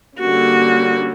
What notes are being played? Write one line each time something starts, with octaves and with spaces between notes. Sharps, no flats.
D3 G3 A#3 C#4 F#4